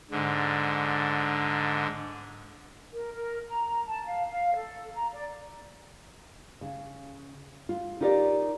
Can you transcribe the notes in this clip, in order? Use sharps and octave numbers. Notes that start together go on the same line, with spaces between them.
G#2 D3
A#4
A#4
A#5
A5
F5
F5
A4
A#5
D5
C#3
F4
D#4 F4 G4 A#4 C#5 D5